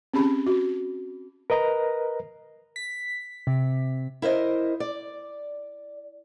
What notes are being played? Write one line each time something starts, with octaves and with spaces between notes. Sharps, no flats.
C4 C#4 G4 G#4 A5 B5
F#4
A#4 B4 D#5 A#5
B6
C3
E4 A#4 C5 D#5
D5